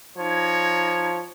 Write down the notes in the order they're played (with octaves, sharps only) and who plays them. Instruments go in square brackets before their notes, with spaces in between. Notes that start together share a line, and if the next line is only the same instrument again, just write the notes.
[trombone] F3 [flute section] D#4 G#6 [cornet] C#5